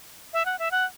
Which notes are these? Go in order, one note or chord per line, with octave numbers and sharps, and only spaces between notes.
E5
F#5
E5
F#5